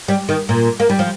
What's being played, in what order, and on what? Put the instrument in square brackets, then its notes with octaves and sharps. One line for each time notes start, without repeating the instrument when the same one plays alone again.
[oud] G3
D#3
A#2
A#3
G3
F3